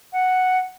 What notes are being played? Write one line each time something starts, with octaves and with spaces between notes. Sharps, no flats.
F#5